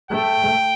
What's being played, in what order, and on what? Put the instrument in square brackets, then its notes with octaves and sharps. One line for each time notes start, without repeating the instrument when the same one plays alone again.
[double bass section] A3 [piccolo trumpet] G5